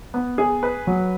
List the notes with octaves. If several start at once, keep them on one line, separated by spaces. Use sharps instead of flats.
B3
G#4
B4
F#3